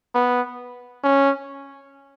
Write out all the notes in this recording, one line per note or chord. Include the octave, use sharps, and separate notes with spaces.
B3
C#4